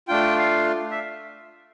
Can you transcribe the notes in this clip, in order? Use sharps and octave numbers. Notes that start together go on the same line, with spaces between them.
A3 D4 F4 G5
F5
E5